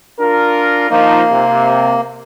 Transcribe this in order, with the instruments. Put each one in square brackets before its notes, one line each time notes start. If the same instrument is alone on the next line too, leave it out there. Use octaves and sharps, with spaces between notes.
[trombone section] D4 F4 A#4
[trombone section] F3 D#4 [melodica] A#3
[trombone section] C3